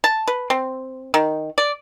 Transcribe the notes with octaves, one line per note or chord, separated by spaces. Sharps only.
A5
B4
C4
D#3
D5